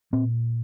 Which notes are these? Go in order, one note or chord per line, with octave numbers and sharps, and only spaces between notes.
A#2 C4